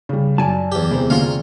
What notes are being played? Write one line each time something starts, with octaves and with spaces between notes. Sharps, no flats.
C#3 G3
F#2 D5 G#5 A5
E2 G4
E1 C3 E3 C5
D3 A#3 C#4 F4 F5